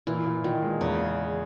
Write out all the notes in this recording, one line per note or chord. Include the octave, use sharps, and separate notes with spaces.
A#2 E3
A#2
A#2 D#3
G#3
E2 C#3